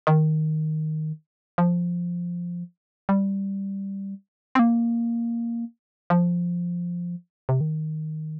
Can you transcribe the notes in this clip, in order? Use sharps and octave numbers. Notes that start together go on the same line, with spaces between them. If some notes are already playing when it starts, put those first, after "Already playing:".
D#3
F3
G3
C4
A#3
F3
C3
D#3